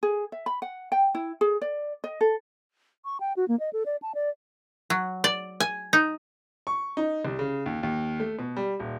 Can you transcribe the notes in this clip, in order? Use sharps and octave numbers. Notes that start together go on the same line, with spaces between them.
G#4
E5
B5
F#5
G5
E4
G#4
D5
D#5
A4
C#6
G5
F#4
A#3
D#5
A4
D5
A5
D5
F#3
D5
G#5
D#4
C#6
D#4
C2
C#3
D#2
D#2
A3
B2
G3
D#1